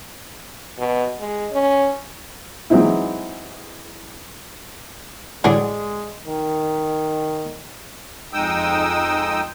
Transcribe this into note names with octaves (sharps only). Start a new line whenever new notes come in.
B2
G#3
C#4
E3 F#3 G#3 C4 D#4 E4
A2 D3 F#3 G#3 G#4 D5
D#3
F2 G#3 D#4 G5 D#6 E6